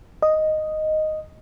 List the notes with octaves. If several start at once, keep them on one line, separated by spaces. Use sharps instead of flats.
D#5